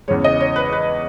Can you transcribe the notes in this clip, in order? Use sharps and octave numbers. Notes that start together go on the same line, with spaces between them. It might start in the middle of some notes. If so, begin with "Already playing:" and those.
E2 C#3 E3 G#3 C#5
D#5
C#5
B4
B4